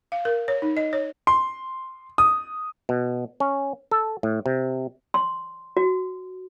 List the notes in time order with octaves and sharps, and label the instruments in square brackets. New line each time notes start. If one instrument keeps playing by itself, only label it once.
[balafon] F5
A#4
C#5
D#4
D#5
C#5
[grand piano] C6
D#6
[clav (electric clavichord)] B2
C#4
A4
A2
C3
[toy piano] C6
F#4